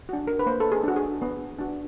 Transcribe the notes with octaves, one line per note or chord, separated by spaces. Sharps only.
D4 F#4
A#4
B4
A#3 C5
A4
G#4
D4 F#4
G#4
B3
D4 F#4